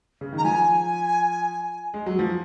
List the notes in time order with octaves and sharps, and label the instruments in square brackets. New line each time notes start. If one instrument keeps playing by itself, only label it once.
[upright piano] C#3
D#3
[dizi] A#5
[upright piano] F3 [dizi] G#5
[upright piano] G#3
F#3
F3